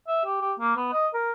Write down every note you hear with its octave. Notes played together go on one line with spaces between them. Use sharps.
E5
G4
G4
A#3
B3
D#5
A#4